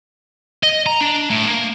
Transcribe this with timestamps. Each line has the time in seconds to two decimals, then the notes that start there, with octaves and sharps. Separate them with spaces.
0.63 D#5
0.86 A#5
1.00 D4
1.30 A2
1.47 A#3